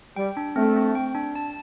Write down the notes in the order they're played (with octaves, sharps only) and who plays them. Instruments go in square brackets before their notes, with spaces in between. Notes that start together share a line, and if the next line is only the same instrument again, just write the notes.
[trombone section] G3 [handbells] G5
[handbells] D4
[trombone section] A3 [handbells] C4
[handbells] C4
G5
D4
A5